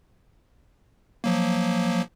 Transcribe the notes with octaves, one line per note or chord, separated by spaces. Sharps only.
F3 F#3 A#3